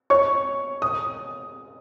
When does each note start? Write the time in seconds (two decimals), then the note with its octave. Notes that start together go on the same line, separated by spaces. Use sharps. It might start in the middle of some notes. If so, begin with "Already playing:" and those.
0.10 C#5 C#6
0.82 D#6